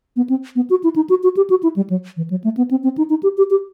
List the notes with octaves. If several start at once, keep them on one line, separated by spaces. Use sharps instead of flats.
B3
C4
B3
F#4
E4
D#4
F#4
F#4
G4
F#4
E4
G3
F#3
E3
F#3
A3
B3
C4
C4
D#4
D#4
G4
G4
G4